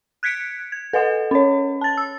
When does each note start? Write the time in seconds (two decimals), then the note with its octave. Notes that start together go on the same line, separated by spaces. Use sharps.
0.23 F#6 G#6 B6 C#7 D7
0.72 G#6
0.93 A4 B4 D#5 F#5
1.31 C#4 C#5
1.81 A5 A6
1.97 E6